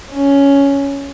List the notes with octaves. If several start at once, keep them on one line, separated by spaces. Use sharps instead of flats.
C#4